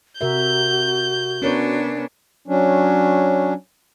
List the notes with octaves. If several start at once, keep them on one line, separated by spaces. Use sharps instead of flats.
C3 F#4 A#4 E5 G6
B3 C#4 D4 A#4 C#5
F#3 C#4 D4